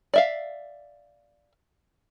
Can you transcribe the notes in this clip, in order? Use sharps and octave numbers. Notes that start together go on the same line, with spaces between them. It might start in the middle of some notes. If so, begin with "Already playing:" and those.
D5 E5 F5